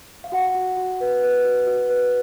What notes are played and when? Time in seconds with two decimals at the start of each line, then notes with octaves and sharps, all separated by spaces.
0.24 F5
0.32 F#4 F#5
0.55 F#4
0.77 F#4
1.00 B4
1.23 B4
1.45 F#4
1.67 F#4
1.89 B4